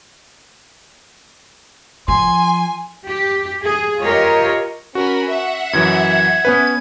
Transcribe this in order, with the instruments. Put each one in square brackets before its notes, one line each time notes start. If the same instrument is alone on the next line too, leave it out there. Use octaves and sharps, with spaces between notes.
[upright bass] F3 [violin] G#5 [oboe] C6
[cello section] G4
G#4
F4 G4 A#4 C#5 D#5
[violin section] C#4 A#4 B5 [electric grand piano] F#4
[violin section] E5 F#5
[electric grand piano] F#2 E3 F#3 [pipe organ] G#6
[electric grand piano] B3 C#4 B4